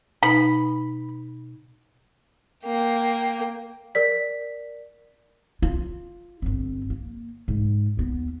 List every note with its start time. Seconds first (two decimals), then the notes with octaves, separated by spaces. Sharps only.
0.23 B2 D#4 B4 B5
2.65 A#3 G5
3.95 A#4 D5 B6
5.62 F4
6.42 G1 C4
6.90 A#3
7.48 G#2
7.97 D#2 B3